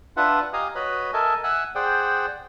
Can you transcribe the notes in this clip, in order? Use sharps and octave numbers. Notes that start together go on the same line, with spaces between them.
D4 F4 B4 E5 F#5
G4 D#5 F5 G#5 A#5 D#6
F#4 B4 C#5 D#5 B5
A4 A#4 D#5 E5 G#5 A5
E5 F#5 G#5 E6 F#6
G#4 C5 D5 F#5 G5